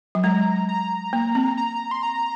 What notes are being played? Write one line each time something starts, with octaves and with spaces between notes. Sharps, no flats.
F#3
G#3 A#5
A#5
A#3
C4
A#5
C6
A#5